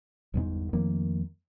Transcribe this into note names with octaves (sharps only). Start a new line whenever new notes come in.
G1 E2 G#2
F2 D#3 A3 A#3